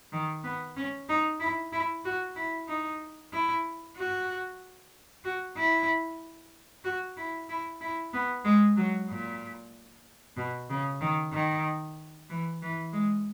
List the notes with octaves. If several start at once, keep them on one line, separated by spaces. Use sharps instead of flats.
D#3
B3
C#4
D#4
E4
E4
F#4
E4
D#4
E4
F#4
F#4
E4
F#4
E4
E4
E4
B3
G#3
F#3
A#2
B2
C#3
D#3
D#3
E3
E3
G#3